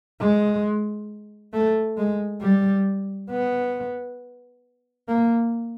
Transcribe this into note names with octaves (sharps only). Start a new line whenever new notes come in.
G#3
A3
G#3
G3
B3
A#3